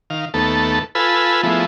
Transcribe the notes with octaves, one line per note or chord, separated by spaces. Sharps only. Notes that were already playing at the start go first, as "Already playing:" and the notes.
D#3 F5
D#2 A3 B3 A4
F4 A4 B4 G#5 B5 E6
F3 G#3 A3 B3 E4